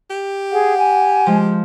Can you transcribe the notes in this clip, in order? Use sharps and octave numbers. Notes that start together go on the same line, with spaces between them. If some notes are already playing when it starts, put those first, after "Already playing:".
G4
G#4 F#5
G#5
F3 G#3